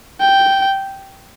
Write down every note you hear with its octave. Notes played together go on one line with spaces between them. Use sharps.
G5